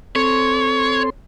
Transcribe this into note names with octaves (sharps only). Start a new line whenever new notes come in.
C4 A4 C#5 C6